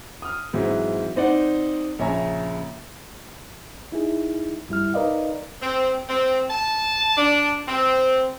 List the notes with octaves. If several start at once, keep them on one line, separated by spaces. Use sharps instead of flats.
D#6 F6
G#2 E3 F#3 C4
C4 D#4 C5 D5 F#5
A#1 C#3 C#5 E5 G#5 A#5
D#4 E4 G#4
G2 G3 E4 F6
D#4 A#4 B4 D5 D#5 F5
C4
C4
A5
D4
C4